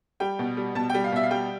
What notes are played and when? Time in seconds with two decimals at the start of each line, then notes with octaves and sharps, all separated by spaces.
0.20 G3 G5
0.39 B2
0.57 G3
0.75 B2 A5
0.90 G3 G5
1.04 F5
1.12 B2 E5
1.23 F5
1.31 G3 G5